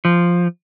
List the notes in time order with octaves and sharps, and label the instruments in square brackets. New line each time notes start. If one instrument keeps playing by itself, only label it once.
[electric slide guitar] F3